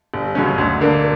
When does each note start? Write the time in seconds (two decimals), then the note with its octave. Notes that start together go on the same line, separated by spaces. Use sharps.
0.14 G1
0.35 F#2 C#3 F#3 C#4
0.58 D2
0.81 D3 A#3